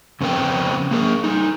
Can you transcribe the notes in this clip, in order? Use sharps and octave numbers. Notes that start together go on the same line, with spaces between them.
F2 C#3 B3 C4 A#4 G5
A#3 G#4 A#4
G3 D#4